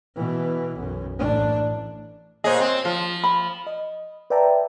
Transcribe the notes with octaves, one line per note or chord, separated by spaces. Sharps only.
B2 E3
B1 F#2
A1 D4
A#2 G#4 C5 C#5 D#5
C4
F3 F4
B5
D#5
B4 D5 E5 G5 A5 A#5